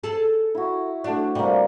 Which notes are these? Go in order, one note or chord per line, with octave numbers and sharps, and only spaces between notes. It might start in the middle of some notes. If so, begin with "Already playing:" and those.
G#4 A4
E4 F#4
A3 D4 F#4 C5
C3 G3 A#3